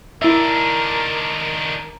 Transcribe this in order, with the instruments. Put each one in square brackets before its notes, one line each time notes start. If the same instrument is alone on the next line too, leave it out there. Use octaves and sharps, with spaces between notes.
[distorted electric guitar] D#3 D4 [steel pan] E4 E5 [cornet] A#4